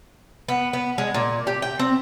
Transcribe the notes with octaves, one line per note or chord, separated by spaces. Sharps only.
B3
B3
G#3
A#2
G4
G5
C4